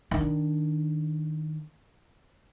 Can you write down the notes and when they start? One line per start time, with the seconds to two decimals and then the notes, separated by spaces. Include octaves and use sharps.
0.11 D#3 D4